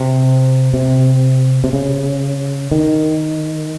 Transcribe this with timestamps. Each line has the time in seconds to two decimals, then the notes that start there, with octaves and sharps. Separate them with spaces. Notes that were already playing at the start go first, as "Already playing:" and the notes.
Already playing: C3
0.74 C3
1.64 C3
1.73 C#3
2.71 D#3